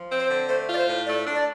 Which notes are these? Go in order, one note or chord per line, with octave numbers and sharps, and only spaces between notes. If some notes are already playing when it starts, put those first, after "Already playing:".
Already playing: F3
C4
C5
D3
A3 C5
F4
D5
C5
A2
A3 D5
D4
D5